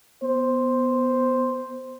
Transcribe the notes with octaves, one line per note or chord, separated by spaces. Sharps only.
B3 C5